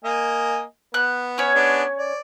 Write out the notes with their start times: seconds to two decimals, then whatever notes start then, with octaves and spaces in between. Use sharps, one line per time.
0.04 A#3 D#5 G#5
0.94 B3 F#6
1.38 C#4 C#5
1.55 B3 D4 G#4
1.98 D5